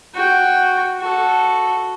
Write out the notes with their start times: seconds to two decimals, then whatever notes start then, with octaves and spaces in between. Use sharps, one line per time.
0.14 F#4 G5
0.99 F#4 A4